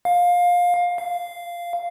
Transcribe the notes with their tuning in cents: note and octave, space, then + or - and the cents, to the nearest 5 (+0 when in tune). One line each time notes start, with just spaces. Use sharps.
F5 +20
F5 -10